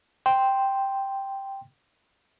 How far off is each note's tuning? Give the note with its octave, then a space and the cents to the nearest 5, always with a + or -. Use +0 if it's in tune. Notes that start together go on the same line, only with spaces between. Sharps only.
G5 +0 C6 +0